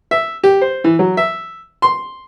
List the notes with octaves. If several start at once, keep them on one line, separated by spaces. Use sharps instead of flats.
E5
G4
C5
E3
F#3
E5
C6